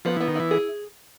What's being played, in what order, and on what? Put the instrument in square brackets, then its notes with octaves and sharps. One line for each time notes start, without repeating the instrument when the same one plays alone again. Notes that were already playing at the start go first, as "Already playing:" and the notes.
[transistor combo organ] F3 [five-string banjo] B3
[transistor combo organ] E3 [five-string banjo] B3
[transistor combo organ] D#3
[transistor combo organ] E3 [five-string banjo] E4
[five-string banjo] G#4